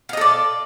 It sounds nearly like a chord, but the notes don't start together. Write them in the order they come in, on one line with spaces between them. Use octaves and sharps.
F4 D#5 A4 D5